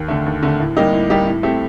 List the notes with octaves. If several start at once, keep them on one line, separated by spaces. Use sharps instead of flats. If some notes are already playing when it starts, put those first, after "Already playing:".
Already playing: D#2
D3 A3
D#2
D3 A3
A2
G3 A#3 D#4 G4
A2
G3 A#3 D#4 G4
A2
A3 C4 G4